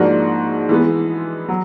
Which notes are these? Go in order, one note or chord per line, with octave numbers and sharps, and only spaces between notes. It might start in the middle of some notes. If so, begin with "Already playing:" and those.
Already playing: G#2 F3 A#3 D4 F#4
E3 G#3 B3
F#3